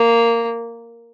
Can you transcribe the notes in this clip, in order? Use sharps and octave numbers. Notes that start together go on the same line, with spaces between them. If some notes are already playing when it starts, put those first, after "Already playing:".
Already playing: A#3